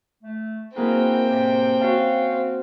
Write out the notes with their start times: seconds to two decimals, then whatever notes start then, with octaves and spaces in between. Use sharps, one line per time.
0.22 A3
0.76 A#3 C4 E4 F#4 G#4 A#4 B4 G5
1.30 A2 C3
1.81 C#4 F#4 C#5 F5 A5
2.31 C4